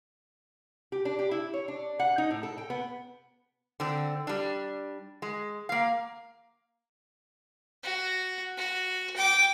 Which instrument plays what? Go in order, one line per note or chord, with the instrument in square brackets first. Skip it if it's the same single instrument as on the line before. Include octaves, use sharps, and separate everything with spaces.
[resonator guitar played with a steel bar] G4
D4
G4
E4
C#5
D4
F#5
D#4
A2
A4
G5
B3
D3 C4
G3 D4
G#3
A#3 F5
[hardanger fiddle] F#4
F#4
G5 D6